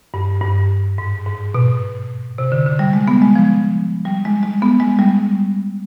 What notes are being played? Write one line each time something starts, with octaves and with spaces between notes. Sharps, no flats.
G2
G2
G#2
G#2
B2
C3
D3
D3
G3
G#3
B3
G#3
F3
G3
G#3
G#3
B3
G#3
G3